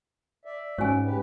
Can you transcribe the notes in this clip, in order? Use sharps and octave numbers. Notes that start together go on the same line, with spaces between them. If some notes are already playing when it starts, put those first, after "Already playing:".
D5 E5
G#2 C#4 F#4 C#5 G#5
C#3 G4 B4